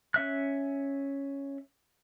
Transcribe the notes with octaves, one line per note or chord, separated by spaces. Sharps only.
C#4 E5 F#6